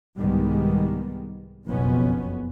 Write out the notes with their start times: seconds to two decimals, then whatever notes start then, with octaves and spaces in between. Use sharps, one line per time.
0.17 C2 G#2 D#3 G3 G#3 B3
1.66 F#1 B1 F2 B2 B3 C#4